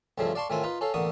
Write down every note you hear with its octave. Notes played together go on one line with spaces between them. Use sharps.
D2 G2 C#3 F3 A3 C4
D5 F5 A5 C6 C#6
A2 D#3 A3 C4 F4 G#5
D#4 F4 B4
C#4 A4 F5
A1 D3 A#3 B3 C#6 D#6